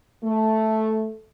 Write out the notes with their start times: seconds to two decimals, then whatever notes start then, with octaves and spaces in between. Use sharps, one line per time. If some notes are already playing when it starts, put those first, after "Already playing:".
0.23 A3